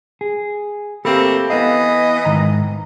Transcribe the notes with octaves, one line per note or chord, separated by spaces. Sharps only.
G#4
A3 A#3 C4 G4 A4 B5
E3 B3 D#5 F5
G#2 D#3 A#5